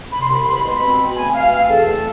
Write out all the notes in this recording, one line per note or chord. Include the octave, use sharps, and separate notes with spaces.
C3 B5
C6
C2 B5
G#3 C6
B5
B2 C6
B5
C4
B2
A3 G#5
B2 F5
C4 F5
E2 A4
A3